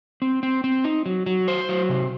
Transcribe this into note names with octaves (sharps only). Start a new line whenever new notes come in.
C4
C4
C4
D#4
F#3
F#3
C5
F#3
C3